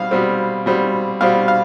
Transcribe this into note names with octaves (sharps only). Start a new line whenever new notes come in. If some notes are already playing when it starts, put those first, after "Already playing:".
Already playing: B2 G3 C4 F5
B2 G3 C4
B2 G3 C4
B2 G3 C4 F5
F5